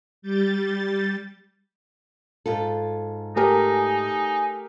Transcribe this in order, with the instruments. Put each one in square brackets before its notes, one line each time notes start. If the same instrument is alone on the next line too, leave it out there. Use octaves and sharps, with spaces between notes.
[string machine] G3 G6 A6
[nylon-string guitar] G#2 F4 A4
[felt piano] A3 G4 A#4 [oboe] D#4 [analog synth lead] G#5